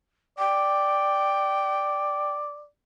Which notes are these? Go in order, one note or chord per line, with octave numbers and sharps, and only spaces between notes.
D5 G5